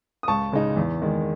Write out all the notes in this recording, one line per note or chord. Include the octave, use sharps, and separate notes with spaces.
D#6
C#2 A5 C#6
C#3 G#3 D#4
E2
D#3 G#3